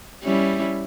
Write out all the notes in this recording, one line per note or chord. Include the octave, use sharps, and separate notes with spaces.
G3 C#4 E4